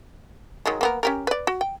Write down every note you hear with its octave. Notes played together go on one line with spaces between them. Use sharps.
D#3 F#3 G#3
A#3 B3 A#4
C#4 G4 A#4
B4 D5
F#4
G5